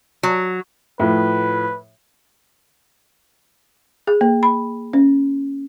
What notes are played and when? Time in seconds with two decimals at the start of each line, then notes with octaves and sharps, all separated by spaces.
0.23 F#3
1.00 A2 F3 B4
4.07 G#4
4.21 A#3
4.43 B5
4.93 C#4